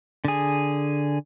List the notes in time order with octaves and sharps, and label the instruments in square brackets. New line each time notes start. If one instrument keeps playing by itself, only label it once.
[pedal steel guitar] D3 G#4